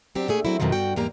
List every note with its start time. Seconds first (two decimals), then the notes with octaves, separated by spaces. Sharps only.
0.15 F#3 C4 D4 G4
0.28 A#2 A3 G#4
0.45 F#3 C4 E4
0.60 F2 B2 D#3 F3 F#3
0.72 G2 F#4 G5
0.96 E2 G#2 A#3 G4 A#5